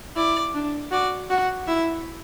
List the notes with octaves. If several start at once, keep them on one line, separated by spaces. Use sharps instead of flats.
E4 D5
D4
F#4 D5
F#4 F#5
E4 E5